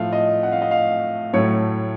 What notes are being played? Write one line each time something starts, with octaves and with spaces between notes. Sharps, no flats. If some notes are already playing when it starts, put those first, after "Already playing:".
Already playing: A2 F3 A3 F5
D#5
F#5
F5
D#5
F5
A2 F#3 A3 C#5